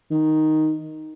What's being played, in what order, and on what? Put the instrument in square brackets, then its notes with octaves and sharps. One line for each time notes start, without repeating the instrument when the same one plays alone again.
[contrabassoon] D#3